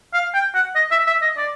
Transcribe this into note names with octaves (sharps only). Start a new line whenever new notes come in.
F5
G5
F#5
D#5
E5
E5
D#5
D5